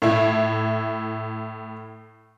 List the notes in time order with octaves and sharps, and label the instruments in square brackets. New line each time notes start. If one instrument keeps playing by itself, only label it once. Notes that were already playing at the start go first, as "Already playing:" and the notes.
[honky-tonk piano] A2 E4